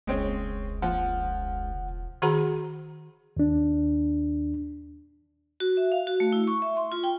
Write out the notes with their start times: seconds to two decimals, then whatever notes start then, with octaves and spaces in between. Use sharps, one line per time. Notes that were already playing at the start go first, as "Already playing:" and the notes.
0.07 E1 C#2 G#3 C4 C#4
0.82 F3 F#5
2.22 D#3 F#4 G#4 F#5 A#5 B5
3.37 D#2 D4
5.60 F#4
5.77 E5
5.92 F5
6.07 F#4
6.20 A3
6.33 E4
6.47 C#6
6.62 E5
6.77 C6
6.92 F4
7.03 G5